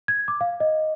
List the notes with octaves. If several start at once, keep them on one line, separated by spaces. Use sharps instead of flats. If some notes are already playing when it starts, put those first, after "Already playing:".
G#6
D6
F5
D#5